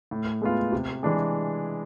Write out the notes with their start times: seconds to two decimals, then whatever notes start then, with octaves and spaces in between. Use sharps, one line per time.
0.11 A2
0.42 G#3 B3 F4
0.72 C3
1.03 E3 G#3 D4 G#4